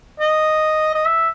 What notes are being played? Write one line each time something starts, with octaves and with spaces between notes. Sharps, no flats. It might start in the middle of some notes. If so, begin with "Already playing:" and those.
D#5
D#5
E5